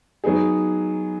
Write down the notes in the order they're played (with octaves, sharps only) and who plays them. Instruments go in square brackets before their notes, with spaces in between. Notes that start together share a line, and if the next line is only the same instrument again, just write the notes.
[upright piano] F#3 B3 D#4 G#4